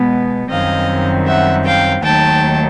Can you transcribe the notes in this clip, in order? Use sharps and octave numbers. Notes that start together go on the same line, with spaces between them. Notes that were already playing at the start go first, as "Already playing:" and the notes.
Already playing: B2 G#3 B3
F#2 D#3 G3 C4 D#5 F5
E5 F#5
F5 G5
D#2 D#3 F#3 A3 G5 A5